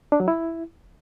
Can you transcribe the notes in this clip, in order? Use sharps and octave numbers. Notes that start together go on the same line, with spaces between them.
D4
F#3
E4